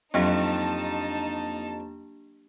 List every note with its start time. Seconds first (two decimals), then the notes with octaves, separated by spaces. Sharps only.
0.14 F2 F#3 A#3 D4 D#4 G4 A5